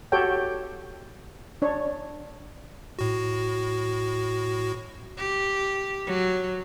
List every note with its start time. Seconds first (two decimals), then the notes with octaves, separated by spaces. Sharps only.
0.12 F#4 G4 A4 C#5 G5
1.62 D4 C#5
2.99 A2 F#4
5.17 G4
6.06 F#3